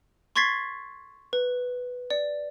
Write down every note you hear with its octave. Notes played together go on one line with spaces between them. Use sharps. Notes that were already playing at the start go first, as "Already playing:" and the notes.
C6 C#6 G#6 A6 B6 C7
B4
D5